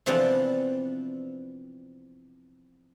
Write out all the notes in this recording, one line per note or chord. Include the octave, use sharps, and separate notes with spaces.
C3 E3 F3 B3 C4 D4